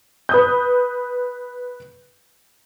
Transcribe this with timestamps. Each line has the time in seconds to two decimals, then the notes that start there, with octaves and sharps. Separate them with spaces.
0.29 B4 D#6 G6